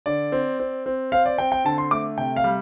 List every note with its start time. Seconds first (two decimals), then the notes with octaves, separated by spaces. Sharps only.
0.06 D3 D5
0.32 C4
0.60 C4
0.86 C4
1.12 C4 F5
1.26 D5
1.38 C4 G5
1.52 G5
1.65 D3 A5
1.78 C6
1.91 A3 D6
2.18 C3 G5
2.36 F5
2.44 G3